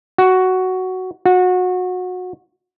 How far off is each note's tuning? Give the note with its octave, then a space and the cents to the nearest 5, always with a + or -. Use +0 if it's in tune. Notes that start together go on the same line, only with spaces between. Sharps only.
F#4 +5
F#4 -25